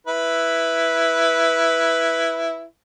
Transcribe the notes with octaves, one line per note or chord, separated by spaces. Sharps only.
E4 B4